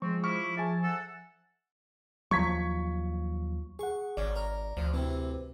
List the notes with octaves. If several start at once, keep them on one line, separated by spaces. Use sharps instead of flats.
F3 G#3 C4 C#6
E4 C#6 D6 F6
G#4 E5 G#5 A5
A4 F#5
D#2 F3 F#3 C#6 G#6 B6
G#4 F#5 C#6
G#1 C#4 D5
A#4
D2 F3
C3 E3 C4